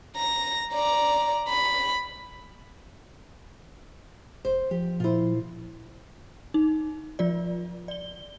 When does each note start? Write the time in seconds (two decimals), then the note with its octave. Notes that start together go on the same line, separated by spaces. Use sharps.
0.16 A#5 A#6
0.74 D5 A#5
1.49 B5
4.45 F1 C5
4.71 F3 G4
5.00 A#2 E4 F4 C5
6.54 D#4
7.19 F3 F4 D5
7.88 D5 G7